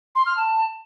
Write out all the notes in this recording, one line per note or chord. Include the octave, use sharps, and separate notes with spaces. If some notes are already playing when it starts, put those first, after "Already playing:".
C6
F6
A5